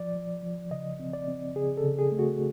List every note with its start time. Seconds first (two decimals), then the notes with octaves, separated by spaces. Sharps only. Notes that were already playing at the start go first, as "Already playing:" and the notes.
Already playing: F3 D5
0.15 F3
0.43 F3
0.71 C#3 D#5
1.00 C4
1.13 D5
1.28 C4
1.56 C#3 G#4
1.77 A4
1.84 C#3
1.98 G#4
2.12 A3
2.19 F#4